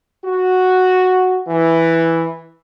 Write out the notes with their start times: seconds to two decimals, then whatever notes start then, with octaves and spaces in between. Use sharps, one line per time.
0.24 F#4
1.48 E3